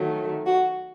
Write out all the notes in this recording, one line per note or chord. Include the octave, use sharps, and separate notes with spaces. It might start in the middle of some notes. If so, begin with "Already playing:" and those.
Already playing: D#3 F#3 A3
F#4